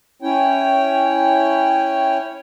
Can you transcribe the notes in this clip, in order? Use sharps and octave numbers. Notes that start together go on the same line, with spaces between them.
C#4 E4 C#5 G5